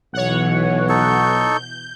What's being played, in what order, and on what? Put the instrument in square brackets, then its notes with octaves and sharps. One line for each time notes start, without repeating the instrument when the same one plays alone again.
[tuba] B1 [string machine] B2 E3 [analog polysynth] C#5 F#5
[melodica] D#4 A4 C#6 [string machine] G6